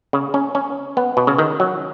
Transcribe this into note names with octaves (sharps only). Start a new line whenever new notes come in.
C#3
C#4
C#4
B3
B2
C#3
D#3
F#3